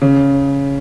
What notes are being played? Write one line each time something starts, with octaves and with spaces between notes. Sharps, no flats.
C#3